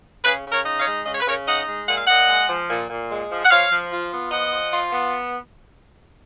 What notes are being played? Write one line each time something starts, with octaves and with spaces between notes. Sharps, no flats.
C#3 G#4 B4
C#3
A#4 C#5
D#4
C#5 F5
G#3
C#3 D#5
C#5
B4
C#3 A#4 C#5
D#4 D#5 F#5
G#3
A#2 F#5
F5
A#2 D#5 F#5
G#3
F3
A#2
A#2
G#3
F3
F#5
F3 C#5 F5
F3
F4
B3
F3 D#5 F#5
F3
F4
B3